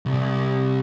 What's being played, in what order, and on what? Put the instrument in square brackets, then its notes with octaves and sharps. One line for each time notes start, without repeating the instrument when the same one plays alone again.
[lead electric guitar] C2